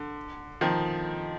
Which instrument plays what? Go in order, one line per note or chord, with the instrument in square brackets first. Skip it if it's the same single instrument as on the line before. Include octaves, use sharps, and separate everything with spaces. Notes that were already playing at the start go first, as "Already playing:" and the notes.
Already playing: [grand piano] D3
D#3 F3